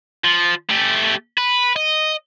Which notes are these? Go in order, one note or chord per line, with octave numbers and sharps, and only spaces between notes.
F3
A3 G4
B4
D#5